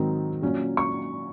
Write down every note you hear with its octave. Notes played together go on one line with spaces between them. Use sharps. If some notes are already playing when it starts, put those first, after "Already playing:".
Already playing: G#2 D#3 F#3 C4 D#4
A#2 F#3 C#4
C#6